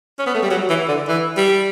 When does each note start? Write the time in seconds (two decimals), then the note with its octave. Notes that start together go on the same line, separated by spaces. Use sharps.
0.19 C#4
0.26 B3
0.34 A3
0.42 G3
0.50 F#3
0.69 E3
0.88 D3
1.08 E3
1.37 G3